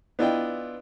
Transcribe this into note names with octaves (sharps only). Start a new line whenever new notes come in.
B3 D4 E4 F4 D#5 G5